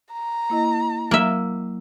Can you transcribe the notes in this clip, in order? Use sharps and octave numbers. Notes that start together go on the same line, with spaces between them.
A#5
A#3 E4 D#5
F#3 A#3 E5